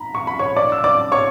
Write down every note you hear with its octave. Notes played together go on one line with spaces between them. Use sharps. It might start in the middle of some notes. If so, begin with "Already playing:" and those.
Already playing: A#5 B5
C#6
B5
C#5 C#6
D5 D6
E6
D5 D6
C#5 C#6